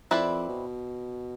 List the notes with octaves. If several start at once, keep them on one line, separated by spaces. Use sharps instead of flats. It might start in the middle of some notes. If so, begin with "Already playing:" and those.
F2 C4 E4 B4 D5
B2